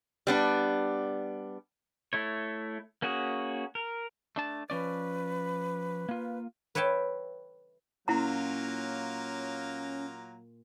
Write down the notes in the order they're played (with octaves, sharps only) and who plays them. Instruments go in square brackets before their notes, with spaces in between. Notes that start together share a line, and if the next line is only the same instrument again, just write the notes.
[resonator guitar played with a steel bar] G3 B3 D4
[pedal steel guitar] A3 E4 C#5
A#3 C#4 F#4 G#4
A#4
[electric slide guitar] A3 D4 A5
[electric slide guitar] F3 C#4 D5 [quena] B4
[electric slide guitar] A#3 F4
[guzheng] B4 C#5 E5 G5 A5
[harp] A#2 [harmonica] F#3 A#3 F4 [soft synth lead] C#4 [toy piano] E4 F#5 A#5